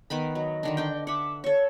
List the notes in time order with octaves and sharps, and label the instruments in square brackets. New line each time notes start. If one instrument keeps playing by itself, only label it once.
[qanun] D#3 B3 B5
[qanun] F#3 [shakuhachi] D#5
[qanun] D3 D#3 D4
D4 G5
[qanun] E5 F#5 [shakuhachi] D6
[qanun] A4 C#6 [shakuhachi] C#5